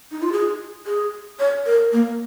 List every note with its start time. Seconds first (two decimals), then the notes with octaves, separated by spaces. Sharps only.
0.12 D#4
0.22 F4
0.32 G#4
0.87 G#4
1.39 C#5
1.66 A#4
1.93 A#3